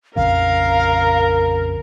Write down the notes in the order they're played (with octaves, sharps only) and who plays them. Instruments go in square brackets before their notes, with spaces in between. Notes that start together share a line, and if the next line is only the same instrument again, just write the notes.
[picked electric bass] A#1 F2 C#3 [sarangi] A#4 [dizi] F5